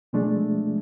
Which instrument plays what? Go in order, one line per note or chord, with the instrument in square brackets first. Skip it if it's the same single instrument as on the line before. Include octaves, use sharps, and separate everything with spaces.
[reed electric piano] B2 F3 G#3 A3 D4